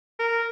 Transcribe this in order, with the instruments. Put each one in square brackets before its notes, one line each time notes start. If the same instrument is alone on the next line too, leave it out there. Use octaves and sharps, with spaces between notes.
[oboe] A#4